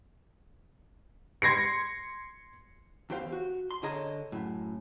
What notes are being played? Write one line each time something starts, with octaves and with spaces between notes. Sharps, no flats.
C6 G#6 A#6 C7 C#7
E2 G4 C5 F5
F#4
C6
D3 G#4 C#5 D#5 A#5
F#2 A2